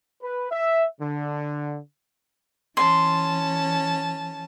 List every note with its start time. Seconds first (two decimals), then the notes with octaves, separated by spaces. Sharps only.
0.22 B4
0.51 E5
1.00 D3
2.77 E3 C#4 A5 C6